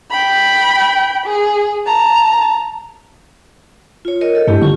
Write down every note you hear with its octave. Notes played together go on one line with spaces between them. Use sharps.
G5 B5
G#4
A5 A#5
F4 C#5
A#4 C#5 D#5
A4 D#5
G2 A3 E4 G4
D3 F4 C#6